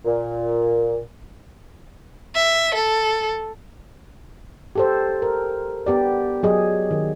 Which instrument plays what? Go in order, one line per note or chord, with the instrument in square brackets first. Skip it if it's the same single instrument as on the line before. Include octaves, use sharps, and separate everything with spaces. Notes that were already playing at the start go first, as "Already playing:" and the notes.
[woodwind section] A#2
[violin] E5
A4
[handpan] G4 A4 C5
A#4
B3 G4 D5
F#3 G#4 D#5
D#3